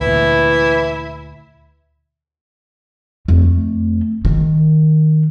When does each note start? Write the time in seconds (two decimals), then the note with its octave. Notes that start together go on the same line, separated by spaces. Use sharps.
0.01 D2 A#2 E3 E4
3.28 F2 A3
4.25 D#3